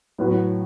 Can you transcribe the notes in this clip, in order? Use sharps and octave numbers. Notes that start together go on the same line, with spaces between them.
A2 F#3 B3 F#4